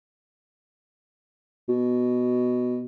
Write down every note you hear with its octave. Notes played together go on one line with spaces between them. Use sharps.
B2